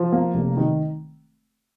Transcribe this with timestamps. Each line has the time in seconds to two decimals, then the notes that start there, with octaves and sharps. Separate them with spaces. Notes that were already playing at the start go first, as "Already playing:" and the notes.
Already playing: F3
0.12 A#3
0.34 F1
0.57 D#3